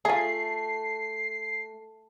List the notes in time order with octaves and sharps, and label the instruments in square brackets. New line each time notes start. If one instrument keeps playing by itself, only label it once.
[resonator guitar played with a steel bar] A3 [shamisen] F4 G#4 [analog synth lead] C7